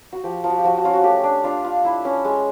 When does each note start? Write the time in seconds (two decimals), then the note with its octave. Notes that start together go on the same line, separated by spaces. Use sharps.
0.13 F#4
0.24 F3 G4
0.44 F3
0.50 F#4
0.58 G4
0.64 F3 F#4
0.78 F#4
0.84 C#4 F4
0.93 F#4
1.04 A3 G4
1.24 D4
1.44 D4 F4
1.64 F4
1.85 E4
2.05 C#4
2.25 G#3